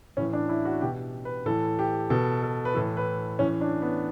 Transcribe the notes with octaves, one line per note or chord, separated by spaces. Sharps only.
A2 E3 C#4
D4
E4
F#4
B2 G4
B4
A2 E3 A4
G4
B2 A4
A4
B4
A2 E3 A4
B4
A2 E3 C#4
D4
B3